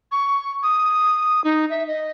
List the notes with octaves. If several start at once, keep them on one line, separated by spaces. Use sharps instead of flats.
C#6
D#6
D#4
E5
D#5